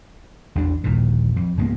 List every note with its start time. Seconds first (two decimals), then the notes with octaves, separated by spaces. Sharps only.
0.55 A1 E2 D4
0.84 A#1 D#2 A#2 E3
1.36 F2
1.57 C#2 G#2 A#3 B3